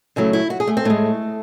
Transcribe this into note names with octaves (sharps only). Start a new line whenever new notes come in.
C#3 F#3 A3 E4
E4
F#4
G#4
A3
C4
A2 G#3 A3